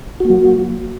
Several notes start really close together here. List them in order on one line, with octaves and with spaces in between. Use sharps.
F#4 A#3 F#3